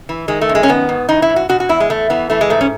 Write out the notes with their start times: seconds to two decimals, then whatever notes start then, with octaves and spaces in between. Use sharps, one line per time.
0.09 E3
0.28 D#3 G#3
0.41 A3
0.49 F#2
0.55 G#3
0.63 C#4
0.68 D#3 B3
0.89 G#2
1.09 E3 D#4
1.22 E4
1.30 A2
1.36 F#4
1.49 B2 F#4
1.60 F#4
1.69 E2 E4
1.80 G#3
1.90 E2 A3
2.10 E3 B3
2.30 E3 A3
2.41 G#3
2.50 G#2 A3
2.61 C#4